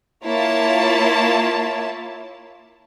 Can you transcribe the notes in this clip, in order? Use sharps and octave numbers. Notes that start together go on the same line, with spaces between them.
A#3 E4 F4 C#5 A5